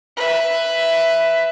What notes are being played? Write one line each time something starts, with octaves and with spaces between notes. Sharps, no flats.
B4 E5